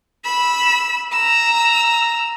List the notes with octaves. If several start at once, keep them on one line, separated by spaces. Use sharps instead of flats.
B5 E6
A#5 E6